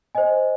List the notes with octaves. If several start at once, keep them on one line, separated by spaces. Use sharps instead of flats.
C5 D#5 G#5